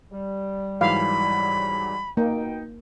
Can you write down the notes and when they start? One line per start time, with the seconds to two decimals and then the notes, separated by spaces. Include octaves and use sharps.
0.11 G3
0.81 G#2 E3 F#3 F5 B5
2.17 B2 A#3 D#4 G5